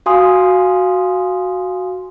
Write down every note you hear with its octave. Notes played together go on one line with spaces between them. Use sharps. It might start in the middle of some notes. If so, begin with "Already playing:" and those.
F#4 F5 G#5 C6 D#6